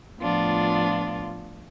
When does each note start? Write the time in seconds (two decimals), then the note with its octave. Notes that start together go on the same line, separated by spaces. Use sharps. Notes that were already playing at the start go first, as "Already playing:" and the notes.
0.19 A2 F3 B3 D4 F4